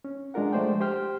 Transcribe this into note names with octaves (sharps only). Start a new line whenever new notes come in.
C#4
G#3 D4 F4 A#4 F#5
F3 G#3 A3 C5 D5 G5
G4 C5 G5 F6